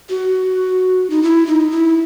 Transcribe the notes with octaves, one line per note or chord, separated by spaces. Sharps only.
F#4
D#4
E4
D#4
E4